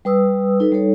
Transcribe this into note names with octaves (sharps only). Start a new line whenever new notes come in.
G3 B4 D#6 E6
D#4 A4 B4
G3 D#4 A4 C#5